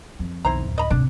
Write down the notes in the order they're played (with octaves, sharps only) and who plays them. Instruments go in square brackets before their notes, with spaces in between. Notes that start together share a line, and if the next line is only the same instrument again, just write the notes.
[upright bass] F2
[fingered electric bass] B1 B2 D#3 [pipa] E4 C5 A#5
[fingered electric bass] D1
[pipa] D#5 A#5 B5
[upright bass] G#1 C3 [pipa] D4